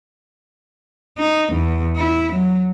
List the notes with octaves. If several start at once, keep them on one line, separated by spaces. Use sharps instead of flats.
D#4
E2
E4
F#3